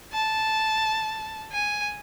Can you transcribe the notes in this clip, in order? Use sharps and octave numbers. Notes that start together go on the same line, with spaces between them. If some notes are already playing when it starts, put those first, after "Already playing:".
A5
G#5